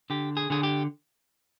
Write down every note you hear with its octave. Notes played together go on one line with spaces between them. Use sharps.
D3 G4
G#4
D3 G#4
G4